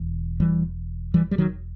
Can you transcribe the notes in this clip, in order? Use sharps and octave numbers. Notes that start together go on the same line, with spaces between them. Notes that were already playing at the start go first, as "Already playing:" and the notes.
Already playing: E1 E2
E3 G3
E3 G3
G3
D#3 F#3